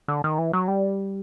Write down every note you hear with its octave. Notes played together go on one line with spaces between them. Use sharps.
D3
D#3
E3
F#3
G3